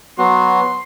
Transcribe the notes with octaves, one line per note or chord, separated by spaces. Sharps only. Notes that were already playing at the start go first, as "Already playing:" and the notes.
F#3 B3 F#4 C6